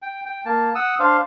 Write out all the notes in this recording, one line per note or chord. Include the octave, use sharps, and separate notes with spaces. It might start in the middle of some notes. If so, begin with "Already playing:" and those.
G5
G5
A#3 A5
F#5 D#6 E6
D4 C5 F5